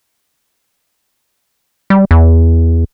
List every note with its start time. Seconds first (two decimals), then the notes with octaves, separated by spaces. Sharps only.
1.90 G3
2.11 E2